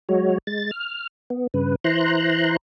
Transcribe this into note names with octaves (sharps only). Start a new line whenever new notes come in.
F#3 G#3 F#4 C#5
G#3 A6
F6
B3
G2 C#3 B4
E3 E4 C5 A#5 C6 F#6